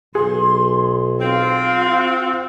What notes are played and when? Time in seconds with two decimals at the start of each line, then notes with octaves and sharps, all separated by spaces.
0.15 B1 G#4 C6
1.20 C4 F4